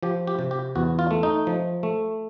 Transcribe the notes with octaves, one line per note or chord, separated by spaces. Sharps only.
F3 G4
G4
C3
G4
E2 F#4
F4
A3
D#4
F3
A3